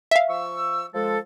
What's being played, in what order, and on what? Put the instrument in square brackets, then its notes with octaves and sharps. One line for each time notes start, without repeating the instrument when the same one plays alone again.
[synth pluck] E5 F5
[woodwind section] F3 C#6 E6
F3 G#3 A4